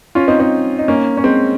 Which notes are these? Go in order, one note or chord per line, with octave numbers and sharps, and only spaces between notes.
C#4 F4
C4 D#4
C4 D#4
D#4
A#3 C#4
C#4
G#3 C4